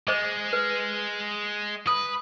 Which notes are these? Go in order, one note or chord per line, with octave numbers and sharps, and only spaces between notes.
G#3 C5 D#5 D6
B4
B4 D#6